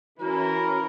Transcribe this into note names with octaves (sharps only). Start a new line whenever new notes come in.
E3 C#4 E4 F#4 A#4